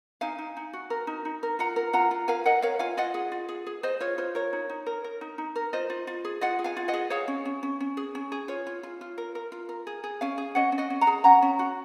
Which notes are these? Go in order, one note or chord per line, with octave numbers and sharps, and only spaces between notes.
D#4 F5 G#5
D#4
D#4
F#4
A#4
D#4
D#4
A#4
F4 F#5 A#5
A#4
F4 F#5 A#5
F4
A#4 F5 G#5
A#4 D#5 F#5
A#4 C#5 F5
F4 F5 G#5
F4 D#5 F#5
G#4
F4
G#4
G#4
G#4 C5 D#5
F4 C#5
F4 C5
A#4 C#5
D#4
D#4
A#4
A#4
D#4
D#4
A#4
F4 C5 D#5
F4
F4
G#4
F4 D#5 F#5
G#4
F5 G#5
F4
D#5 F#5
G#4
G#4 C#5 F5
C#4
C#4
C#4
C#4
G#4
C#4
G#4
F4 C#5
F4
F4
F4
A#4
A#4
F4
A#4
G#4
G#4
C#4 F5 G#5
G#4
C#4 D#5 F#5
C#4
D#5 F#5
C#4
F#5 A#5
G#4
C#4 F#5 A#5
C#4
F#4